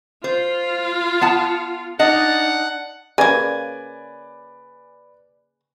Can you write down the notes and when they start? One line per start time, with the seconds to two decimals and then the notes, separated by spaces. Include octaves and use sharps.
0.24 F4 C5
1.21 B3 F#5 A5
1.99 D4 D#4 D#5 F#5
3.18 C#3 A#3 B4 D5 G#5